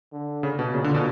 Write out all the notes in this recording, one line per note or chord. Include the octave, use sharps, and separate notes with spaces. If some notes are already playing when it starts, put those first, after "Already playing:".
D3
C#3
B2
A#2 C#3
D3
B2